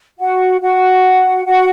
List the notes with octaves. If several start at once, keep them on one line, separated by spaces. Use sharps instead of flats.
F#4 F#5
F#4 F#5
F#4 F#5